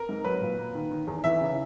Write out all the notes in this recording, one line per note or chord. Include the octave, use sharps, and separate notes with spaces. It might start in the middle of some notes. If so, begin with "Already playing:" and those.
Already playing: A#4
G#2
F#3 B4
A#2
A#3
D#3
D#3
E2
E3 E5
C#3